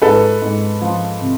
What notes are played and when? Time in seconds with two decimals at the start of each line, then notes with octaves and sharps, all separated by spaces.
0.02 G#2 A4 B4
0.42 G#2
0.81 F3
1.21 C3